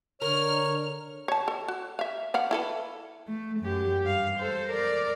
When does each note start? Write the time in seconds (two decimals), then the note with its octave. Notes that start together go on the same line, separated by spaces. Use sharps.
0.22 D3 A#4 C#5 F6
1.28 C#5 A5
1.48 A4
1.68 F#4
1.99 E5 F5
2.34 D5 F5 F#5
2.51 E4 A4 B4
3.27 A3
3.60 F#2 G4
4.04 G2 F5
4.39 A4 C5
4.69 A#4 D5